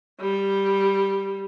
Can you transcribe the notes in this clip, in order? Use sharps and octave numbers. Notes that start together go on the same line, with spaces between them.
G3